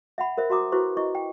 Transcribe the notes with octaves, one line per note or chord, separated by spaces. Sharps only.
E5 F#5 B5
A#4 C5 E5
F#4 E5 A#5 D6 D#6
E4 F#4 B4 C5 C#6
E4 D#5 C#6
G5